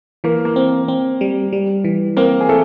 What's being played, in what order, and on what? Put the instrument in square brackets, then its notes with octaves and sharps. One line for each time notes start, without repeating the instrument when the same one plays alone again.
[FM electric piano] E3 [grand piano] A#3 A#4
[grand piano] A#3 A#4
[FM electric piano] C4
C4
G3
G3
E3
[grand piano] A#3 A#4 [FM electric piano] C4
[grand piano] G#4
[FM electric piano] E3 [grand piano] A3 A4